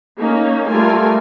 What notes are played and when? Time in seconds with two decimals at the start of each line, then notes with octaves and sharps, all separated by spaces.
0.19 A#3 C#4 D#4
0.67 G3 A3 F4 A#4 G#5